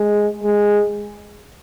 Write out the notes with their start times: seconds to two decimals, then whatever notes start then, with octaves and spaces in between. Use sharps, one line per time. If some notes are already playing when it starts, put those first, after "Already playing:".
Already playing: G#3
0.44 G#3